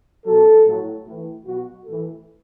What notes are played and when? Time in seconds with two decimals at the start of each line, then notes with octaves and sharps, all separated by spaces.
0.26 B2 F#3 A4
0.66 A2 F#3
1.06 A2 E3
1.46 B2 F#3 F#4
1.86 A2 E3 A4